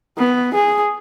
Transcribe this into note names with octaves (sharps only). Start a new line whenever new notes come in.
B3
G#4